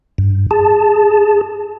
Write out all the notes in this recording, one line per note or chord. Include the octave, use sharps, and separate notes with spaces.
G2
G#4 A5